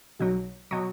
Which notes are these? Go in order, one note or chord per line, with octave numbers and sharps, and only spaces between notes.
B1 B2 F#3
B2 F#3